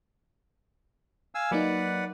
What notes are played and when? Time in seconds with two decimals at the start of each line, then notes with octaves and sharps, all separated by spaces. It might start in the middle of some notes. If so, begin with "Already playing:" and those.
1.35 F5 G#5 E6
1.51 F#3 A#3 D#4 B4 D5 F#5